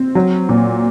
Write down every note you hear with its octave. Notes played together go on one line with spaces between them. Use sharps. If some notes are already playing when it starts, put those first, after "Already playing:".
Already playing: C4
F#3
A#2